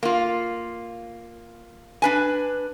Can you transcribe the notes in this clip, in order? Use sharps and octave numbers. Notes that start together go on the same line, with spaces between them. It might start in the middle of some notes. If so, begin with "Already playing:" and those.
A#3 F4
D4 B4 G#5